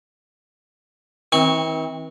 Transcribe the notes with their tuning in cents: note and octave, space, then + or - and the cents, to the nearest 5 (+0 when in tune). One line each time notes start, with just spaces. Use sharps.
E3 -45 C4 +15 C#6 +0